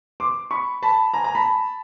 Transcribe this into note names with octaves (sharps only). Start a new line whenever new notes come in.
C6 D6
B5 C#6
A5 B5
G#5 A#5
G#5 A#5
A5 B5